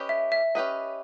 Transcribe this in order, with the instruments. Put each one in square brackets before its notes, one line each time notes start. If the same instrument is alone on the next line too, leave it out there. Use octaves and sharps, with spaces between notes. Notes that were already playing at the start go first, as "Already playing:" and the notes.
Already playing: [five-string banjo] C#4 G4 B4 D#5
[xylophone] E5
E5
[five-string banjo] C#4 G4 B4 D#5